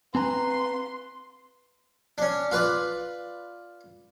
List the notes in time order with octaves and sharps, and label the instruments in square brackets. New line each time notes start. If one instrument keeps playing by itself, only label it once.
[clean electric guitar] C4 G#5 A#5 [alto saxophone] B4 [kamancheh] C6
[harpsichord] C#4 D4
F4 B4 D5